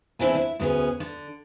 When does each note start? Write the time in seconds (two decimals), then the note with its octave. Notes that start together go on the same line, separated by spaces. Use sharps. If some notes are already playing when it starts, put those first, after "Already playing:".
0.19 E2 C4 D4 E4 C5 G#5
0.35 E4
0.60 D2 B3 C#4 G4 G#4
1.00 D3